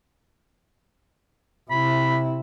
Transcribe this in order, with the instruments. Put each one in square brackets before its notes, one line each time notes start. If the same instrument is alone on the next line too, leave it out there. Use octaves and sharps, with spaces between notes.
[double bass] C3 E4 [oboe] B5